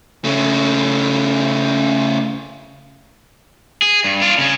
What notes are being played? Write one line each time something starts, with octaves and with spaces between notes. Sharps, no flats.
C#3 A3
G#4
G2
D4 F4
C#3 C#4